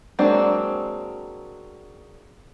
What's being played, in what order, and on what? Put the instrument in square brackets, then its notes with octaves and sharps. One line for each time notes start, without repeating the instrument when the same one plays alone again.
[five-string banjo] F#3 G#3 A#3 C4 D4